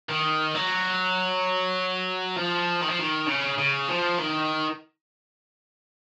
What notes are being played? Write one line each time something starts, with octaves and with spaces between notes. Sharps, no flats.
D#3
F#3
F3
D#3
F3
D#3
C#3
C#3
F3
D#3